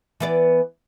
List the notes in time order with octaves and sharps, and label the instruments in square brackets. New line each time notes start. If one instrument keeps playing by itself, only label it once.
[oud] E3 B3 D5